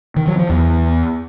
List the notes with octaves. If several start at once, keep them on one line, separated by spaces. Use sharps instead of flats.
D#3
F#3
F3
E2